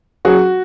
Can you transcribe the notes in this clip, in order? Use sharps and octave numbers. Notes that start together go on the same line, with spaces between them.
F#3 C#4 F#4 G#4